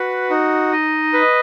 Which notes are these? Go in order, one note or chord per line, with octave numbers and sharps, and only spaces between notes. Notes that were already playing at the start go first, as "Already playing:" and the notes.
Already playing: F#4 B4
D#4
D#5
B4